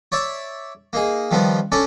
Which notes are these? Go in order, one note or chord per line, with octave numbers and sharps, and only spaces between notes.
C#5 D5 E5
A#3 D#4 G#4
D#3 F3 G3 B3 D#4
C#4 D4 A4 D5